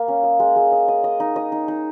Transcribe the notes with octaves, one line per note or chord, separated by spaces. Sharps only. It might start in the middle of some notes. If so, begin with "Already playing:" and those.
Already playing: A#3
C#4
D#5
G#3
G#3
D#5
D#5
D#5
D#4
D#5
D#4
D#4